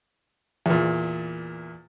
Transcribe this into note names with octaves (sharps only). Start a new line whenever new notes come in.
E2 A#2